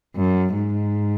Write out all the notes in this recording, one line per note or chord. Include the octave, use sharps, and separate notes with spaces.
F#2
G#2